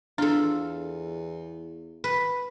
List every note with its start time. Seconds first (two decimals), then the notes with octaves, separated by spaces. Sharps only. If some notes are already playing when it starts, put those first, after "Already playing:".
0.18 E2 D4 F4 A4
2.04 B4